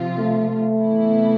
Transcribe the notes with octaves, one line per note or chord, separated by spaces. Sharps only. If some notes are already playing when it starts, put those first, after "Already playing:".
Already playing: C3 F3 C4 F4
A3
A3
C3 E3 B3 E4